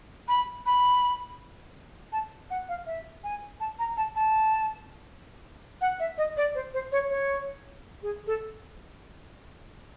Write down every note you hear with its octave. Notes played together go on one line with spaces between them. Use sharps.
B5
B5
A5
F#5
F5
E5
G#5
A5
A#5
A5
A5
F#5
E5
D#5
D5
C5
C5
C#5
C#5
G#4
A4